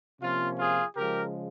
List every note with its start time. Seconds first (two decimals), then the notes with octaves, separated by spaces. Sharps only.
0.21 C3 F3 A#3 C#4 F4
0.58 F4 G#4
0.96 C#3 F3 G#3 G4 A#4